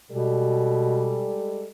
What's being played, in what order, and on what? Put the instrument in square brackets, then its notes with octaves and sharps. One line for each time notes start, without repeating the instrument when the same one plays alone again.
[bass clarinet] B2 [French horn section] G3 G#3 A4